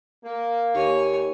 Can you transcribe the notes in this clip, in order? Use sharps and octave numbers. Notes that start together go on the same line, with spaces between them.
A#3
D#2 C#5 G#5